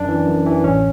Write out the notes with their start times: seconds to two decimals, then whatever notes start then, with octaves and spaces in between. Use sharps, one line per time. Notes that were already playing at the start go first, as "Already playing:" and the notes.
Already playing: F#2 D4
0.08 E3
0.27 F#2
0.46 E3
0.64 A1 C#4